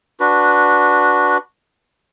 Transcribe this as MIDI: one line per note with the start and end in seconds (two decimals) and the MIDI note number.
0.20 1.38 62
0.20 1.38 66
0.20 1.38 71